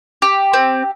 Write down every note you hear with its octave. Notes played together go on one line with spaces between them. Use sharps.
G4
C4